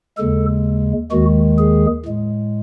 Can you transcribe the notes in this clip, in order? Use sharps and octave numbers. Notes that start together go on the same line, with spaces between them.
D#2 C#3 G#3 A4
D#2 D#3 G#3 F#4
G#4
A2 G#3